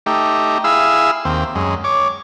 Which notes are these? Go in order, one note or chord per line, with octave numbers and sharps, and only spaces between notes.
A3 D#4 G4
E4 G#4 F5 E6
D#2 C4
F#2 G#3
C#5 D6